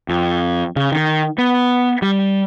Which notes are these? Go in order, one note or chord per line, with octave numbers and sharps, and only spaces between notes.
F2
C#3
D#3
B3
G3